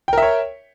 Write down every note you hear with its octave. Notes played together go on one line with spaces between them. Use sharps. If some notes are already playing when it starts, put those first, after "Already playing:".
A#4 C#5 E5 G5